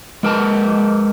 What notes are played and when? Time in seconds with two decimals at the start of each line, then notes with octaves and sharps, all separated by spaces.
0.23 G#3 A#4 B4 A5